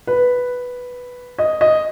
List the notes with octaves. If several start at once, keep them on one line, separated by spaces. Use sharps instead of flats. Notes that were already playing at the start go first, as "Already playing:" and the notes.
B4
D#5
D#5